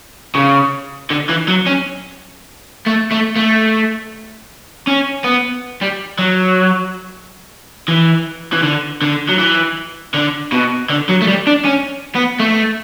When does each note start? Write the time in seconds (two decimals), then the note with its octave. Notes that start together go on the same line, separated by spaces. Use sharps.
0.35 C#3
1.11 D3
1.29 E3
1.48 F#3
1.66 C#4
2.86 A3
3.11 A3
3.36 A3
4.87 C#4
5.24 B3
5.81 G3
6.18 F#3
7.88 E3
8.53 E3
8.63 D3
9.02 D3
9.29 F#3
9.38 E3
10.14 D3
10.52 B2
10.90 D3
11.09 F#3
11.22 A3
11.27 G3
11.47 D4
11.65 C#4
12.15 B3
12.40 A3